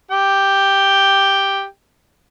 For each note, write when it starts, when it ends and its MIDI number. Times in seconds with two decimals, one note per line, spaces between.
0.11 1.65 67
0.11 1.65 79